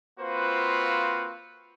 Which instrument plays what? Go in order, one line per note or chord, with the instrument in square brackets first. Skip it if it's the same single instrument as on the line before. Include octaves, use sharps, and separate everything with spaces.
[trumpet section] A#3 C4 F4 F#4 B4 C5